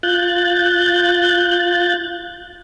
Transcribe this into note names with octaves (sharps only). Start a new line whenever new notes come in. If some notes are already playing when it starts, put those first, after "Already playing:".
F4 F#6 G6 A6